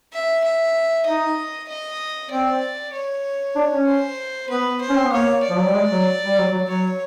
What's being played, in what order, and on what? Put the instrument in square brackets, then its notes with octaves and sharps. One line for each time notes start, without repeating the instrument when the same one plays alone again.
[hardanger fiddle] E5
E5
[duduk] D#4 [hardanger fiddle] D#5
[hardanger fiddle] D#5
[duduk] C4 [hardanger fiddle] D5
[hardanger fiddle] C#5
[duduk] D4
C#4
[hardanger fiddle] C5
[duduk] B3 [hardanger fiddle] B4
[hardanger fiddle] C5
[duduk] C#4
C4
B3
[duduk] A#3 [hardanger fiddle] C#5
[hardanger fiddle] D5
[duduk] F3
F#3
G3
G#3
F#3
G3
F#3
F#3
[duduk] F#3 [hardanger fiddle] C#5